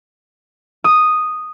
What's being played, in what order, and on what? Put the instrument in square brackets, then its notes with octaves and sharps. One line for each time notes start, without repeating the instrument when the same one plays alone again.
[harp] D#6